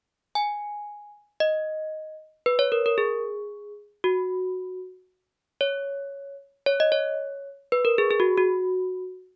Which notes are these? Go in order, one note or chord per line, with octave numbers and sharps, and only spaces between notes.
G#5
D#5
B4
C#5
A#4
A#4
G#4
F#4
C#5
C#5
D#5
C#5
B4
A#4
G#4
G#4
F#4
F#4